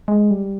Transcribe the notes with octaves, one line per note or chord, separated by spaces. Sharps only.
G#3
G3